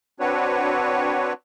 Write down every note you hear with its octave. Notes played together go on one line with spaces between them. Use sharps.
C4 D4 F#4 B4 C#5